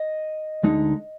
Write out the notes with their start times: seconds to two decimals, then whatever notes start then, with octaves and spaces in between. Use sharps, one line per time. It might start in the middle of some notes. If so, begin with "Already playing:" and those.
Already playing: D#5
0.63 D2 D3 G#3 D#4